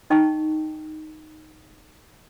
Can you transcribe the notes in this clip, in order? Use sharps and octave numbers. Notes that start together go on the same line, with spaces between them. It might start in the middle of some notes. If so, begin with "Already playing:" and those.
D#4 D#5 G5 A5 C#6